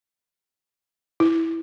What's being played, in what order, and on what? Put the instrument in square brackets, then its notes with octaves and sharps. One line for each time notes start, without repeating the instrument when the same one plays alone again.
[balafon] E4